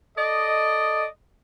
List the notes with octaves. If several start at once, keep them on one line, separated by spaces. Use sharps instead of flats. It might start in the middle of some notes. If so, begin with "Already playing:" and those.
A4 D5 D#5